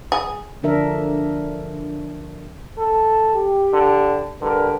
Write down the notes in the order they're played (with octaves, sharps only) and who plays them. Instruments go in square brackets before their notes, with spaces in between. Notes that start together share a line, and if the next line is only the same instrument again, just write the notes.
[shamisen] G#4
[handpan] D3 F3 D4 A#4 E5
[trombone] A4
[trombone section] G4
[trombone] D3
[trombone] D3 [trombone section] G3 A#4 B4